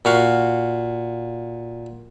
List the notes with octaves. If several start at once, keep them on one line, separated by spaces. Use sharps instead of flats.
A#2 F#4 F5